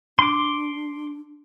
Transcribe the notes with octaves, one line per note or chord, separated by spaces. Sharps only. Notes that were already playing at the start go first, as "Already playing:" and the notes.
D4 C6 D6